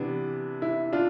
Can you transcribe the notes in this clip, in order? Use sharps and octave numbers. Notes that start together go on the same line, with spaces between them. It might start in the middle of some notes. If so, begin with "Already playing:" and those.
Already playing: C3 E3 B3 D4
E4
D4 F4